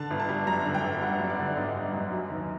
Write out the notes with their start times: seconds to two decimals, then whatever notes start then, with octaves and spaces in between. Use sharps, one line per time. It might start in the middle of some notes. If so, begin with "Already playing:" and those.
Already playing: D3 A5
0.10 G1
0.20 A5
0.29 G3
0.47 F#2 A#5
0.65 D3
0.74 G5
0.84 G1
1.02 G3 F#5
1.21 F#2
1.30 D5
1.39 D3
1.57 G1 D#5
1.75 G3
1.93 F#2
2.11 F#3
2.30 D#2